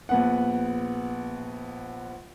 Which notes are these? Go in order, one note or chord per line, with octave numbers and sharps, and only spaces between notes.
A#1 B3 F#5